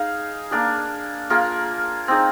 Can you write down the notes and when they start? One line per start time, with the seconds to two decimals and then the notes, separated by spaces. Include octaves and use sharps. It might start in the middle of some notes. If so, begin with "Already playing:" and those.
Already playing: D#4 G#4 F5
0.51 A#3 D4 G#4
1.30 A#3 F4 G#4
2.08 C4 D#4 G#4